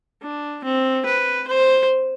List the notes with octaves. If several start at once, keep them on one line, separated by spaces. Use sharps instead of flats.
D4
C4
B4
C5